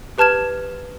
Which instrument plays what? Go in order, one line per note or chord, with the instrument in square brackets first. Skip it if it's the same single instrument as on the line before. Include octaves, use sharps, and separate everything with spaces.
[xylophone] G4 B4 A5 F6 G#6 E7